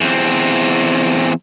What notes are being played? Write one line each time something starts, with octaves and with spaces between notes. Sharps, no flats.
E2 C4